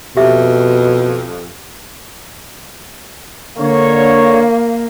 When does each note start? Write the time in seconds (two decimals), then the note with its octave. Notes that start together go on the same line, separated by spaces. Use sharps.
0.17 F2 B2 G4 E5 D6
3.59 D3 A#3 C#5